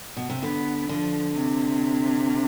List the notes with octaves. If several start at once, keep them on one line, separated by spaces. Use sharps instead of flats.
B2
C3
D3 B3
D3 F3
C3